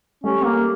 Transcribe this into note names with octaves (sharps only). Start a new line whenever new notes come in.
G3 A3 C#4
A#3